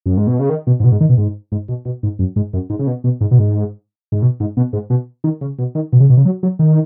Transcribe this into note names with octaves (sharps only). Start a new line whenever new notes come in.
F#2
G#2
B2
C#3
D#3
B2
G#2
B2
G#2
D#3
B2
G#2
G#2
B2
B2
G#2
F#2
G#2
F#2
G#2
C#3
B2
B2
G#2
B2
G#2
G#2
B2
G#2
B2
G#2
B2
D#3
C#3
B2
D#3
B2
C#3
B2
C#3
F#3
F#3
D#3